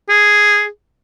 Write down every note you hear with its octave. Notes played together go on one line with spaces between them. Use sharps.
G#4